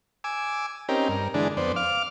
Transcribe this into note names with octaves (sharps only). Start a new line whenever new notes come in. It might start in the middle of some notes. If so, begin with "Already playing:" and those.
G#5 D6 E6
C4 C#4 D#4 G4 A#4
G2 A#4
D3 E3 G#3 D4
F2 B3 C5 D5
F5 D6 F6